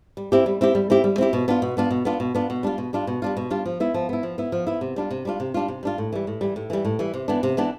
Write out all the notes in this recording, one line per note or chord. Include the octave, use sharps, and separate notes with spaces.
G3
C4 E4 G4
G3
C4 E4 G4
G3
C4 E4 G4
G3
C4 E4 G4
B2
B3 D4 F4
B2
B3 D4 F4
B2
B3 D4 F4
B2
B3 D4 F4
B2
G3 D4 F4
B2
G3 D4 F4
B2
G3 D4 F4
B2
G3 D4 F4
F3
B3 E4
F3
B3 E4
F3
B3 E4
F3
B3 E4
C3
G3 D4 F4
C3
G3 D4 F4
C3
G3 D4 F4
C3
G3 D4 F4
A2
E3 G3
A2
E3 G3
A2
E3 G3
A2
E3 G3
C3
E3 B3 D4
C3
E3 B3 D4